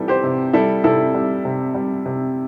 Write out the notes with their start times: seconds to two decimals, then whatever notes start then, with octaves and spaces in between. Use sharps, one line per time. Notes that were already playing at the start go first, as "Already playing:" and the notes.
Already playing: C3 E3 G3 A4
0.08 G4 C5
0.24 C3
0.53 G3 E4 A4
0.84 C3 E4 A4
1.14 G3
1.45 C3
1.74 G3
2.06 C3